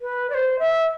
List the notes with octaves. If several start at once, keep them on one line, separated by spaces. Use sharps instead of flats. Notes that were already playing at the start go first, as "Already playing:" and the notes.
B4
D5
C5
E5